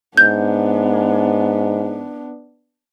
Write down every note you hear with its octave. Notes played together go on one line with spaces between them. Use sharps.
G#2 B3 D4 G6